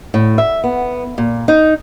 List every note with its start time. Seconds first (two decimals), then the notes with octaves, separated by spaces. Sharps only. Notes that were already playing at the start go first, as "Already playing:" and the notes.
0.14 A2
0.38 E5
0.64 B3
1.18 A#2
1.48 D#4